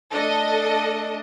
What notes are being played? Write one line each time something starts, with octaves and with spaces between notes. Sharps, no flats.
A3 D4 A4 D#5